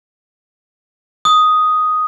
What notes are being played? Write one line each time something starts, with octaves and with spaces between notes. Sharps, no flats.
D#6